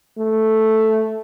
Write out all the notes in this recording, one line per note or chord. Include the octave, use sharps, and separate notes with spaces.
A3